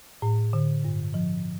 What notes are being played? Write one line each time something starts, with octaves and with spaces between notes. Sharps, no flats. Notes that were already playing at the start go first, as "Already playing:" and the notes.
A2
D3
G2
F3